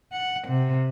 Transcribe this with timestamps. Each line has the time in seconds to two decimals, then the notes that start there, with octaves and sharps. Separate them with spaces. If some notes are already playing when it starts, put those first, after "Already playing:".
0.12 F#5
0.48 C3